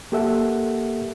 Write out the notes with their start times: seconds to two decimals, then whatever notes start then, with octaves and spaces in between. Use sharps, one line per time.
0.12 A#3 G4 A4 A#4 E5 F#5